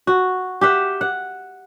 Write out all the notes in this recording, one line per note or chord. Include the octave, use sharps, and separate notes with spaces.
F#4
G4 E5 F#5
F#5